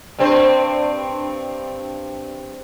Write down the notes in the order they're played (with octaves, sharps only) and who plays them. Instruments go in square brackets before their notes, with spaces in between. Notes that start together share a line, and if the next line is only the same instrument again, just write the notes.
[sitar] G2 C4 C5